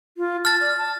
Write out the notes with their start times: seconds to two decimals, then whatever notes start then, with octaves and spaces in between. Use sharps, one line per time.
0.18 F4
0.45 A5 F6 A6
0.60 D5
0.78 A5